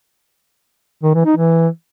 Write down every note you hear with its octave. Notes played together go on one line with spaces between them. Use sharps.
D#3
E3
D#4
E3